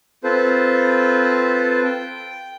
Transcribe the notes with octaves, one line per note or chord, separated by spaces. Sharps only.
C4 F4 A4 B4 C5
G5